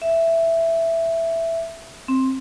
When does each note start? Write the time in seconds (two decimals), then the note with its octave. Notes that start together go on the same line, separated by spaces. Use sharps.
0.02 E5
2.08 C4